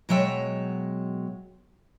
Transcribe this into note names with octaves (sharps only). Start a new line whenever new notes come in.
B2 F#3 G#3 C#5 E5 G5